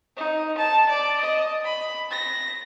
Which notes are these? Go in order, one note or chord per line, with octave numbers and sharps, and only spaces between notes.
D#4
A5
D5
D#5
B5
A#6